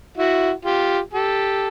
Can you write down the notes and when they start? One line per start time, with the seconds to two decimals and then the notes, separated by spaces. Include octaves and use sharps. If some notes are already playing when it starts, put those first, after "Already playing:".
0.17 E4 F#4
0.65 F4 G4
1.13 G4 A4